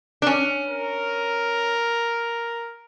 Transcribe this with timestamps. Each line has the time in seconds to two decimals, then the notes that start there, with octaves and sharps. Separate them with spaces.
0.22 D4
0.27 C#4
0.67 A#4